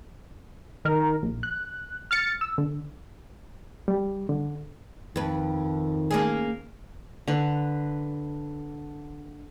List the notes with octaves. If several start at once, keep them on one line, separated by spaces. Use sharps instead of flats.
D#3 A#4
A#1
F#6
F6 A6 C#7
E6
D3
G3
D3
F2 D#3 B4
A#3 C#4 G#4
D3 B4